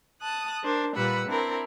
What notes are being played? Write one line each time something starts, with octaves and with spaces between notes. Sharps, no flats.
A5 D#6 F#6
D4 A#4 C5
A#2 G3 B4 F#5 B5 E6
C4 D4 E4 A#4